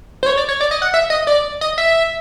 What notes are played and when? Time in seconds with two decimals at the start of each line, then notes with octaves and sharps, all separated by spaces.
0.23 C5
0.26 C#5
0.37 D5
0.49 C#5
0.61 D5
0.71 D#5
0.82 F#5
0.94 E5
1.10 D#5
1.27 D5
1.61 D#5
1.78 E5